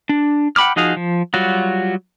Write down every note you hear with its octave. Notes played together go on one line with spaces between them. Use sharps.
D4
F#5 G5 B5 D6 F6
F3 D#4 F#4 G#4 F5
F3
F#3 G3 F4 F#4